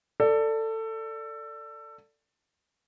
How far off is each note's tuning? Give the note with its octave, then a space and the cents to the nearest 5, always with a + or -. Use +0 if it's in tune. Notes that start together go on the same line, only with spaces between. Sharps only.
A4 +20 D5 +0